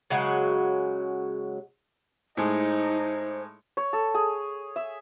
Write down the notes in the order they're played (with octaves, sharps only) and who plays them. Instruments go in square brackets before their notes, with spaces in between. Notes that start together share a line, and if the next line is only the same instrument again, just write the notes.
[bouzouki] C#3 F#3 G#3 F#4
[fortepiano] A2 G#3 [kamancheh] D#4 [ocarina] C5
[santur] C#5
A4
G#4
E5